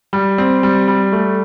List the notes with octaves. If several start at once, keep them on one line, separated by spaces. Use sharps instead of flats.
G3
C4
G3
G3
A3